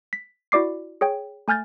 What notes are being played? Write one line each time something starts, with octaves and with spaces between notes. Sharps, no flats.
B6
E4 F#4 D5 D6 C7
G#4 C#5 G5
A3 G#5 F6 G6 A6